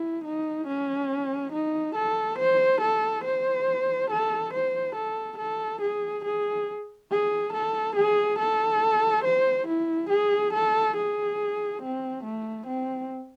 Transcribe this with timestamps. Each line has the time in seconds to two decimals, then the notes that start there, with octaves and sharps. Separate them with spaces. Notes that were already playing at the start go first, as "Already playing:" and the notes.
Already playing: E4
0.24 D#4
0.67 C#4
1.52 D#4
1.95 A4
2.39 C5
2.81 A4
3.24 C5
4.10 A4
4.53 C5
4.96 A4
5.38 A4
5.81 G#4
6.25 G#4
7.11 G#4
7.53 A4
7.96 G#4
8.39 A4
9.24 C5
9.67 E4
10.10 G#4
10.53 A4
10.96 G#4
11.82 C4
12.24 A3
12.67 C4